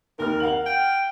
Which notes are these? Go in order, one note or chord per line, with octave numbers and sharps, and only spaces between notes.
D#2 A#4 F6
F5 F#5 F#7
G5